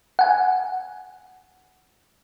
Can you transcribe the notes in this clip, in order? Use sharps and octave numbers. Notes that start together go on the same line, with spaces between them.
F#5 G#5